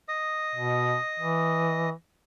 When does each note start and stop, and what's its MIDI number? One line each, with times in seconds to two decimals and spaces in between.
0.08 1.90 75
0.08 1.90 87
0.55 0.97 47
1.19 1.92 52